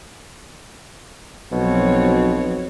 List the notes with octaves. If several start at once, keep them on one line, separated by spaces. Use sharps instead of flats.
B1 B2 F3 C4 C#5